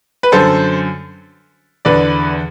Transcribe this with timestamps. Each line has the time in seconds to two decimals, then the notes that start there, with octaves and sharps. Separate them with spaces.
0.23 B4
0.32 F#2 D3 A4 C5
1.85 E2 D3 B4 D5